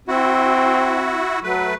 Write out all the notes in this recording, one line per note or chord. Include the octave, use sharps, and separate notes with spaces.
C4 E4 F#4
F#3 A3 B4